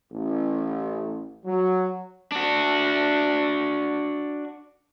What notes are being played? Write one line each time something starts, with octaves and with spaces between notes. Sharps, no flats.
A1
F#3
D4 F#4